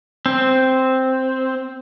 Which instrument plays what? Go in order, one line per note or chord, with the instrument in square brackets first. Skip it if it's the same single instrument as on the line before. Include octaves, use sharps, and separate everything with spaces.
[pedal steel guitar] C4